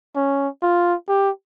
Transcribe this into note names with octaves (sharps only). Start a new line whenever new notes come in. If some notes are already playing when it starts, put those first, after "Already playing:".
C#4
F4
G4